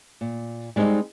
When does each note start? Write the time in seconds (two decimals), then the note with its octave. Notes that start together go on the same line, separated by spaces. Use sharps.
0.21 A#2
0.76 G3 G#3 C4 D4 D#4